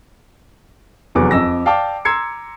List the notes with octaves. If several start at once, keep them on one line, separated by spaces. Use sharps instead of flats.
F1 E2 F#3 B4 D6
F2 D#5 E6 A#6
D5 F5 G5 A5 D6
A#5 C6 E6 G#6 C7 C#7